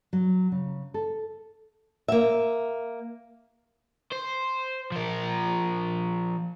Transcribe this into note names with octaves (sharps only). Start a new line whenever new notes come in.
F#3
C#3
A4
A#3 E5
C5
F3 A#4